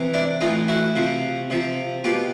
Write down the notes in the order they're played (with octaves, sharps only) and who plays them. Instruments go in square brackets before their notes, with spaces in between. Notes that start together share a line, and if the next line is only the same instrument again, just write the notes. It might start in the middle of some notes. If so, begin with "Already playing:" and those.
Already playing: [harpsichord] C3 E3
D4 E4
A2 E3 D#4 F4
E4 F#4
C3 F3
C3 F3
B2 F4 G4